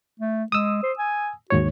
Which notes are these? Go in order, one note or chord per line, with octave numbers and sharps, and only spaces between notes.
A3
G#3 D#6 E6
C5
G#5
D#2 G#2 F#4 C#5